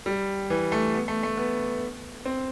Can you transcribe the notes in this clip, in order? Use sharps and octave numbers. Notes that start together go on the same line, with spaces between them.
G3
E3
A3
B3
A3
A3
B3
C4